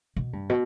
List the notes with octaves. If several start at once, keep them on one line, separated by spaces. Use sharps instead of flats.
B2
G2
B2